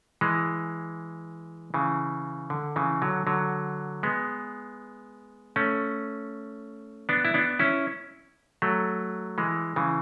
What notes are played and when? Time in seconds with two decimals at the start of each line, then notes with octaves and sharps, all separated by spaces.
0.21 E3 G#3
1.74 C#3 E3
2.50 D3
2.76 C#3 E3
3.02 D3 F#3
3.27 D3 F#3
4.03 G#3 B3
5.56 A3 C#4
7.09 B3 D4
7.25 E4
7.34 B3 D4
7.59 C#4 E4
8.62 F#3 A3
9.38 E3 G#3
9.76 C#3 E3